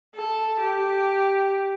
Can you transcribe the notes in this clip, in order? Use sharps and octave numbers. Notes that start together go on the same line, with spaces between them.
A4
G4